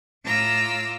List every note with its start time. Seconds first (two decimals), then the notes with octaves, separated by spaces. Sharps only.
0.24 A2 F4 A#5 D6 E6 F6